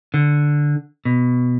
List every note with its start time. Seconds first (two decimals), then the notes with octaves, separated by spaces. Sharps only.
0.14 D3
1.05 B2